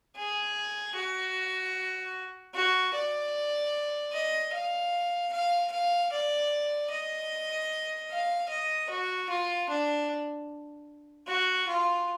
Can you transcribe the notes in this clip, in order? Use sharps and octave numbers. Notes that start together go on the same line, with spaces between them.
G#4
F#4
F#4
D5
D#5
F5
F5
F5
D5
D#5
F5
D#5
F#4
F4
D4
F#4
F4